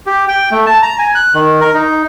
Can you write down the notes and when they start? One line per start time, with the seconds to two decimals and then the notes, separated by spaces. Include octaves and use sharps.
0.07 G4
0.28 G5
0.52 A3
0.66 A5
0.82 A#5
0.99 G#5
1.15 F#6
1.34 D#3
1.61 A#4
1.74 D#4